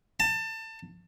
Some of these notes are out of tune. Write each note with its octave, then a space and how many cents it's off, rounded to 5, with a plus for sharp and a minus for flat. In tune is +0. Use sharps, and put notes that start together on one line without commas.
A5 +25